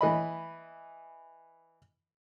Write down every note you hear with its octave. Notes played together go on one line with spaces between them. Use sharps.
E3 D#5 B5